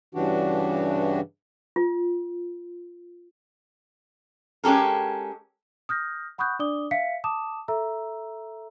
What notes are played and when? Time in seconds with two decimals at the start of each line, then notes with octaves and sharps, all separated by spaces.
0.15 G2 C#3 E3 D4 F#4 G4
1.76 F4
4.64 G#3 C#4 G4 A4 A#4
5.89 D#6 F6 G6 A#6
6.38 F#5 B5 C#6 D#6 F#6 G6
6.59 D4 D5 D6 D#6 G7
6.91 E5 F5 B6 C#7
7.24 A5 D6 D#6 E7
7.68 A4 E5 A#5 E6